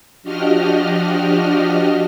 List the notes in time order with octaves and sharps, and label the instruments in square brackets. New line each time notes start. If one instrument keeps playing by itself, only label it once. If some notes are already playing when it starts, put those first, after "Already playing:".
[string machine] F3 D4 F#4 G4 D#5 F6